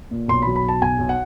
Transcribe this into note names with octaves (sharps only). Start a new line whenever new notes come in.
A#2
B1 C6
F#3 B5
B5
B1 A5
B1 G#5
B1
F#5